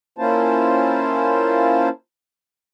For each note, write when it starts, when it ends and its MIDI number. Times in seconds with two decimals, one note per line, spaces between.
0.18 1.89 58
0.18 1.89 61
0.18 1.89 64
0.18 1.89 65
0.18 1.89 72
0.18 1.89 81